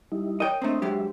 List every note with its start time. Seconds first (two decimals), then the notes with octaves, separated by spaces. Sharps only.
0.12 G3 D#4 E4
0.40 A#4 C#5 D#5 G5
0.62 A3 C4 D4 C5 D#5
0.82 F#3 G#3 G4 E5